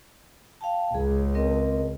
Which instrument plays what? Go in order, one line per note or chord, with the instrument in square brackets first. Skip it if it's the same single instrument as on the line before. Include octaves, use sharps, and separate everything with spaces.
[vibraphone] F5 G5 A5
[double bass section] C#2 [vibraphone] G#4
[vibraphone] C4 A#4 D#5